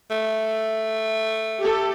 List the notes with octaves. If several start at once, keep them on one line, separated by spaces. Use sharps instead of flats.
A3
G4 A4